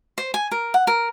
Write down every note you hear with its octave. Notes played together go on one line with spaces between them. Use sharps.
C5
G#5
A#4
F#5
A#4